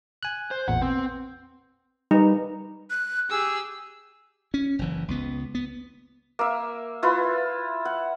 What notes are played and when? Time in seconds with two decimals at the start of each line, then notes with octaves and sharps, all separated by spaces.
0.23 G#5 F#6
0.51 C5
0.68 A1 E2 A#2 F#5
0.82 B3 C4
2.11 G3 D#4 B4
2.90 F#6
3.30 G4 G#4 E6
4.54 C#4
4.79 F#1 E3
5.08 C#2 B3
5.55 B3
6.39 A#3 E5
7.03 E4 F4 B4
7.85 F#5